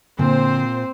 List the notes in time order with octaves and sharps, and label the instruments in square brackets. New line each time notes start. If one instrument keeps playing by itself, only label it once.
[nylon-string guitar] A#2 [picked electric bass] D3 [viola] C4 C5